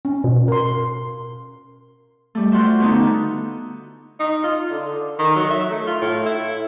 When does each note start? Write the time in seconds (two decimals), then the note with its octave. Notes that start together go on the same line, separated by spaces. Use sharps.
0.05 C#4
0.24 B2
0.48 A#4 C6
2.35 G3 A3
2.52 F4 F#4 C5 E5
2.80 D3 B3 D#4
4.20 D#4
4.44 F4
4.71 D3
5.19 D#3
5.36 F#3
5.50 E5
5.70 A3
5.87 F4
6.01 A2
6.26 E4